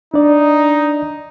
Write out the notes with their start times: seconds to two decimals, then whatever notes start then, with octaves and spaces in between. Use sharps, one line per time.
0.14 D4 D#4 D5